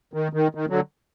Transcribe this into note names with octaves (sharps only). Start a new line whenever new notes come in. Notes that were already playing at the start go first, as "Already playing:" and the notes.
D#3
D#3
D#3
D3 F#3